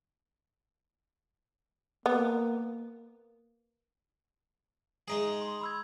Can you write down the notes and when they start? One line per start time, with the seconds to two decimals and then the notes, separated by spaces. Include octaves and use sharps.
2.06 A#3 B3
5.08 G#3 D#4 G#4
5.42 C6
5.61 B5 E6 G#6